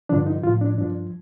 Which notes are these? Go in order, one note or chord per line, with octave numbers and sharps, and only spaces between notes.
G2 D3 F3 D4
D#4
A2 F3 F4
D4
G2 F3 D4